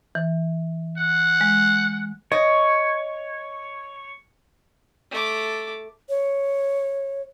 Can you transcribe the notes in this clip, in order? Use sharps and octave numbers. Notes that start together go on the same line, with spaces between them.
E3
F#5
G#3
C#5 D#5
A3 D6
C#5